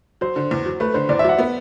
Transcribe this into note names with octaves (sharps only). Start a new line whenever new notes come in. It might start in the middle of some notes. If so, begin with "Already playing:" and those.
F#3 C5
D3
E2
F#3
A3 B4
D3 C5
E2 D5
E5
F#3 F#5
B3